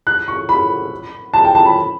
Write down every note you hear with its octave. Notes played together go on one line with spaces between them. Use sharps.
F#6
C#6
B5
A5
G5
A5
B5